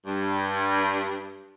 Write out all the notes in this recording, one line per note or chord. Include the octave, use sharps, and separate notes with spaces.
G2